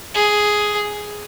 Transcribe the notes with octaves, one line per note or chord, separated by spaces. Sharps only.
G#4